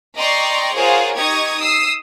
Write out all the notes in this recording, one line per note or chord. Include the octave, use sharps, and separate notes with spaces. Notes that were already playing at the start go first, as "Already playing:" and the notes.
D5 D#5 G5 A#5 C6 C#6
F4 G#4 A#4 C5 C#5 F#5
D#4 G4 C#6 D#6 G#6
D#6 E6 C7